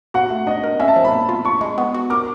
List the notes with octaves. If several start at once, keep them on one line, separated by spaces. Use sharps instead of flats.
F#4 F#5
A3
D4 D#5
A#4
C#4 E5
A5
F3
B5
A#3
F4
D4 C#6
G#3
B3
F#4
A#4 D6